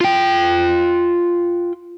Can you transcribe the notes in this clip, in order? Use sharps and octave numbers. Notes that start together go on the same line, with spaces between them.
F4 G5